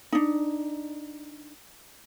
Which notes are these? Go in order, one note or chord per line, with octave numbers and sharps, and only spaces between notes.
D4 D#4